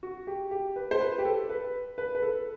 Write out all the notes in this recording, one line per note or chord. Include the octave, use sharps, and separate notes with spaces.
F#4
G4
G4
B4
C5
B4
G4
A4
B4
B4
B4
A4